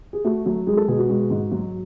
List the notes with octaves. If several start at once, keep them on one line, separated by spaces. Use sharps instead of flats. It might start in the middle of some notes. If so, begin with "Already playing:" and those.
G#4
A3 F#4
F#3
G#3 G#4
A4
B2 G#4
F#4
G#3
G#2
F#3